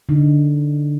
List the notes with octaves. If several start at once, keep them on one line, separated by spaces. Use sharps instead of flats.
D3 D#4